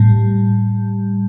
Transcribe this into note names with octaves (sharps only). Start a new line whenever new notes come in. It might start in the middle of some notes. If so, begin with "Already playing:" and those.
Already playing: A2 G3